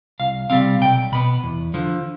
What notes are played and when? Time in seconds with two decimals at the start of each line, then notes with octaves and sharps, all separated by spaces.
0.20 C2 F5
0.50 C3 G3 C4 F5
0.81 B1 G5
1.12 B2 B3 B5
1.43 E2
1.74 D3 F3